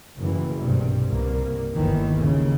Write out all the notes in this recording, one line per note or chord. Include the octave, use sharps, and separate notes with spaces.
F#1 E3
B1 G2 C3
C2 G2 A#3
G1 D#2 D#3 E3
D#2 C#3